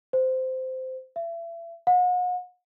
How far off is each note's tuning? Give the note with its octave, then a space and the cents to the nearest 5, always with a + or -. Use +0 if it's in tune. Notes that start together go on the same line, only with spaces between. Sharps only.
C5 -15
E5 +35
F#5 -40